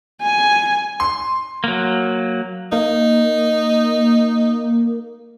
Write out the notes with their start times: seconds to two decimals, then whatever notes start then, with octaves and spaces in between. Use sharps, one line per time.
0.23 G#5
1.00 C6
1.64 F#3 A#3
2.72 A#3 D#4